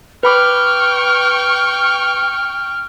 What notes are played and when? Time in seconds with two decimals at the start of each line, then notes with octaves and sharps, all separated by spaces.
0.23 B4 G5 B5 C#6 D6 F6